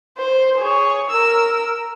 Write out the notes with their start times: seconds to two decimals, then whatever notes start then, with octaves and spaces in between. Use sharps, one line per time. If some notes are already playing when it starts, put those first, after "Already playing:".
0.17 C5
0.58 G#4 C#5
1.09 A#4 E6